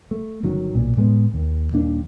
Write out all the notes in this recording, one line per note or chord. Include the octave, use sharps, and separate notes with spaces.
A3
G1 D#3 F#3 C#4
B1 A#2
A2 G#3 B3
D#2
D#1 D#2 D4